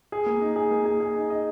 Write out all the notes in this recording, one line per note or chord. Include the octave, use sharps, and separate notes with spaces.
G#4
A#3
D#4
G#4
A#3
G#4
G#4
D#4
D#5